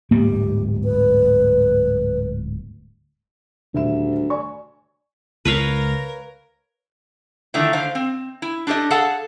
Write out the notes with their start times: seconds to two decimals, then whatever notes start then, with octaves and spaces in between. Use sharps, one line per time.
0.11 D1 G#2 G3 A#3 G4
0.84 B4
3.74 D#1 D2 E5 E7
4.30 D5 G#5 C#6
5.45 C#2 A#4 B4 C#5 F5
7.54 D3 D#3 F3 A3 D#4 E4
7.73 D3 C5 F5
7.95 C4
8.42 E4
8.67 D4 G4 A4 C5 D#5
8.90 G#4 A4 F5 F#5 A5